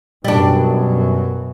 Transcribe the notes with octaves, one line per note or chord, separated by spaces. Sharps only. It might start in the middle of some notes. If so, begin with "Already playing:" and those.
F#2 B2 F#3 G3 D4